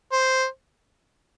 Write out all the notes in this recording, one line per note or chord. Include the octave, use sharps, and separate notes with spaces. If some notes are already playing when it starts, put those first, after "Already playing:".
C5